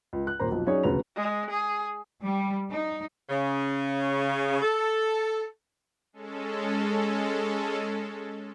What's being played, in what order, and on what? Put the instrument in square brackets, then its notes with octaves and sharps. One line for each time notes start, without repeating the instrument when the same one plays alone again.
[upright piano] C#2
F#6
D#1 A#3 C5 A#5
B1 F2
F#3 C#4 D#4 G#4 C#5 D5
E1 D2 C#3 B4 A#5 F7
[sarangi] G#3
G#4
[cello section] G3
D#4
[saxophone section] C#3
A4
[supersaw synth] G#3 C#4 A4